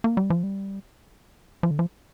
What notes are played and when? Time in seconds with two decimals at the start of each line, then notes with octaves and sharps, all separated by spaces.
0.04 A#3
0.17 G3
0.30 F3
0.43 G3
1.63 F3
1.71 D3
1.79 F3